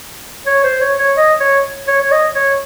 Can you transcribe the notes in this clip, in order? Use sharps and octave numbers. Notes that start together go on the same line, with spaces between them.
C#5
C5
C#5
C#5
D#5
C#5
C#5
C#5
D#5
C#5